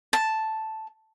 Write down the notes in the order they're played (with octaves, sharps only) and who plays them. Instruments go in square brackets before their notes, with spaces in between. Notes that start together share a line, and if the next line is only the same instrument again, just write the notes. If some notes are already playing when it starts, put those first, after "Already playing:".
[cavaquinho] A5